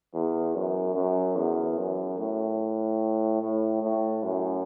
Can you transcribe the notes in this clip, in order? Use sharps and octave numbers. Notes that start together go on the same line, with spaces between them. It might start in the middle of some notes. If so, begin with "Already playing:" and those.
E2
F#2
F#2
E2
F#2
A2
A2
A2
F#2